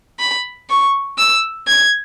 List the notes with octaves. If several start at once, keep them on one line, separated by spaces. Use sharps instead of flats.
B5
C#6
E6
G#6